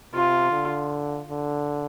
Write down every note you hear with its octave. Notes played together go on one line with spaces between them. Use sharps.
C3 F4
D3
D3